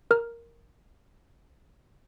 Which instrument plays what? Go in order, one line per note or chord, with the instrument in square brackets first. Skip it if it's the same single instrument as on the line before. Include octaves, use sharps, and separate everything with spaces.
[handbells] A#4 F6